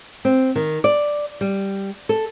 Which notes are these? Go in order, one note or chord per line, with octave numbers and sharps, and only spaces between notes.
C4
D#3
D5
G3
A4